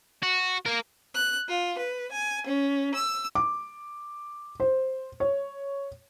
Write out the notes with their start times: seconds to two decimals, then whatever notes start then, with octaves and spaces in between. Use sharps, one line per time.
0.23 F#4
0.66 A#3 A#4
1.14 F#6
1.49 F4
1.77 B4
2.12 G#5
2.47 C#4
2.94 E6
3.35 D6
4.60 C5
5.20 C#5